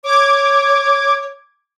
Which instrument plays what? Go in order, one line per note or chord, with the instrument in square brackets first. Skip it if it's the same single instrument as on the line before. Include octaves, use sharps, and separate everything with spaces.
[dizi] C#5 [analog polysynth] D6 G#6